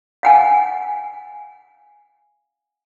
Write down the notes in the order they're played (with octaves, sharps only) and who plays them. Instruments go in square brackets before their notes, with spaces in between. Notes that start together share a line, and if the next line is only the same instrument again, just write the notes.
[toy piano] F5 F#5 G#5